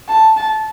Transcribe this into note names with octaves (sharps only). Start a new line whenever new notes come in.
A5
A5